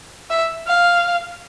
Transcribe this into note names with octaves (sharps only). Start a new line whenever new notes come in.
E5
F5